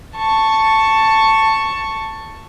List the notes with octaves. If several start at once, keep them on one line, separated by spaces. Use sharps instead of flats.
A5 C#6